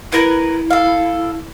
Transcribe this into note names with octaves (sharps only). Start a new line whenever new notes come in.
E4 A#4 B4
A4 F5